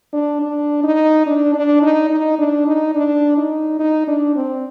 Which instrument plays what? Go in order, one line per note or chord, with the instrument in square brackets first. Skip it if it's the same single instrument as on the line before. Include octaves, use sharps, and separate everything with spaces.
[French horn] D4
D4
D#4
D4
D4
D#4
D#4
D4
D#4
D4
D#4
D#4
D4
C4